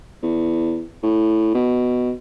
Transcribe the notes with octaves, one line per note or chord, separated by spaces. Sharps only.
E2
A2
B2